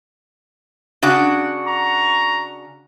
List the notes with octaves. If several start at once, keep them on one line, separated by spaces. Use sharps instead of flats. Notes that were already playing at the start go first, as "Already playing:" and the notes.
C#3 D4 F#4
A#5 C#6